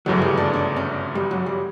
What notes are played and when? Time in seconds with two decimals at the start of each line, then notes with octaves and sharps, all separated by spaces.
0.06 G1 F#2 C#3 E3 F#3 A3
0.22 G3
0.37 D4
0.53 D4
0.76 C#4
1.15 G3
1.31 F#3
1.46 G3